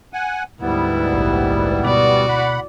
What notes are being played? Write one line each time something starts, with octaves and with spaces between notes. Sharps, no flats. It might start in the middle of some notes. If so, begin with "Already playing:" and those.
F#5 G#5
D2 G#2 G3 B3 E4
A#1
B2 F#4 D5
F#5 B5